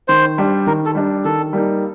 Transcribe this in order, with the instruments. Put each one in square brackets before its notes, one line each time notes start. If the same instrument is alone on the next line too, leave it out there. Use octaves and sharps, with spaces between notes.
[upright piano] D#3 [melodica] C5
[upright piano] G3 D4
[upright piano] D#3 [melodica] A#4
[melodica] A4
[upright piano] G3 D4
[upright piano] D#3 [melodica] A4
[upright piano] G3 A#3 D#4